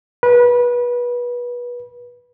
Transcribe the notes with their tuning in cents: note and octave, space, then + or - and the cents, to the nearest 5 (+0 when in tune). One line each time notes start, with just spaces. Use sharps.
B4 -25